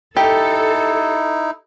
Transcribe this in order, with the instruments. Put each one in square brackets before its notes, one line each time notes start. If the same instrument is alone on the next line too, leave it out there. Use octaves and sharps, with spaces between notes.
[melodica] D#4 E4 [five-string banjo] G4 [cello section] A4